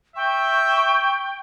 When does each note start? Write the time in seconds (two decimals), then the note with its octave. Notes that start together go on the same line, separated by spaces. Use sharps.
0.16 E5 G5 C#6